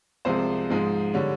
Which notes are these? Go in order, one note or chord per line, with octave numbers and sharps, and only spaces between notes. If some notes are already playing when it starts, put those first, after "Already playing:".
C2 C3 F3 G#3 C5
G#2 F3 G#3
D3 G3 C#5